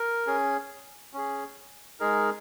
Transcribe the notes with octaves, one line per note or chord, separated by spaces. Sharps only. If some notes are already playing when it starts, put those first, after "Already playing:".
Already playing: A#4
C#4 G#4
C#4 G#4
G#3 D#4 G#4 A#4